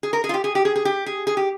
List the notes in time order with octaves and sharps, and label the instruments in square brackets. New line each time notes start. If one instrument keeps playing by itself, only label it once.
[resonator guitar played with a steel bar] G#4
A#4
G#4
F4
G4
G#4
G4
G#4
G#4
G4
G#4
G#4
G4